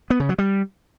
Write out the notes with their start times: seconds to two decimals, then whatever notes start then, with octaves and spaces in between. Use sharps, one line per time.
0.10 B3
0.20 C#3
0.29 F#3
0.38 G3